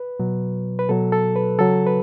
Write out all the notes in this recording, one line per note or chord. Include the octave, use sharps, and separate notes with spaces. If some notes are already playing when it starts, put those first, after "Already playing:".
Already playing: B4
B2 F#3
B4
B2 F#3 A4
A4
B4
C#3 F#3 A4
B4